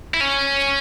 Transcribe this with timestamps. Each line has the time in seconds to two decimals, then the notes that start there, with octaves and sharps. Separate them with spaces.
0.14 E4
0.20 C#4